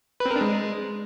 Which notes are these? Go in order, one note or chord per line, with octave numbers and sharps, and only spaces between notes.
B4
C4
A#4
D4
G#3